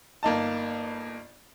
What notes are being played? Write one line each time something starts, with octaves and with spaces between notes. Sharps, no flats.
G1 A#3 D#4 A5